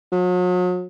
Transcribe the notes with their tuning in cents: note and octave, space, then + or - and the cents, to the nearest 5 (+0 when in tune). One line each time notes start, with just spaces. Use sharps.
F#3 -40